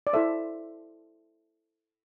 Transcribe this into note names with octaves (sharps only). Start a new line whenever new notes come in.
D5
E4 A4 C5 E5